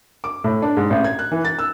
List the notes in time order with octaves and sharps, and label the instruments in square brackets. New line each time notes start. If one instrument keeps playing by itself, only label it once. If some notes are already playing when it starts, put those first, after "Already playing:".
[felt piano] D6
A2
D4
G#2
A1
G#6
F#6
E3
A6
E6